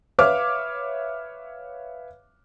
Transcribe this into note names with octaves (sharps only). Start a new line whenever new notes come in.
B4 C#5 E5 F5 D6 F6